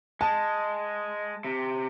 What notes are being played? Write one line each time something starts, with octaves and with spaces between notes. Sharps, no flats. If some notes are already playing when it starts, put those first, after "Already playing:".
G#3 A5
C3